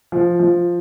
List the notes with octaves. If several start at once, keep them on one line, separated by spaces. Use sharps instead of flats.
F3
F3